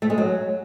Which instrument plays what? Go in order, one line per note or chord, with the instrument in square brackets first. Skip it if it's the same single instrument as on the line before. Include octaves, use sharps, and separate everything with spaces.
[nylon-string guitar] A3
G#3
F#3